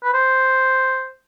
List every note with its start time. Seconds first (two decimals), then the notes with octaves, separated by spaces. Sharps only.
0.03 B4
0.14 C5